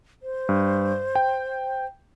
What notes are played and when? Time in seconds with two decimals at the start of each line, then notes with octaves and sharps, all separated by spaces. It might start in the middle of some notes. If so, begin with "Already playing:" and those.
0.23 C5
0.49 G2
1.15 G5